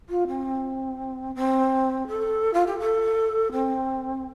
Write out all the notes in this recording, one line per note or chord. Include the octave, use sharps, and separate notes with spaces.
F4
C4
C4
A4
F4
G4
A4
C4